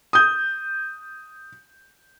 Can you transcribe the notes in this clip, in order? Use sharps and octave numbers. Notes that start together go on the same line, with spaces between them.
D#6 G6